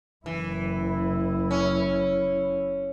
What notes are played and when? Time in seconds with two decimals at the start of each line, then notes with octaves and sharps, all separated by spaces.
0.26 F#1 E3 E4
1.51 C#4